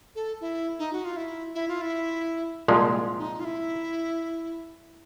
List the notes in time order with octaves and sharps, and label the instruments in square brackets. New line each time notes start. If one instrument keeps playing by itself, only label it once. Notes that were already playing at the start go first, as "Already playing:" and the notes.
[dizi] A4
E4
D#4
F#4
F4
E4
E4
F4
E4
[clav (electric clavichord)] C2 A#2 F3 G#3
[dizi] D#4
F4
E4